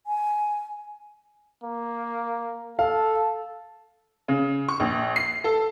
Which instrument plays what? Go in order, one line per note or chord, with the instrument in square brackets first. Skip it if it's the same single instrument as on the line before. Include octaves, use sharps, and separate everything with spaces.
[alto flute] G#5
[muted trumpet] A#3
[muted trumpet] A4 [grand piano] F5
[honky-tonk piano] C#3
C#6
A#1
C7
A4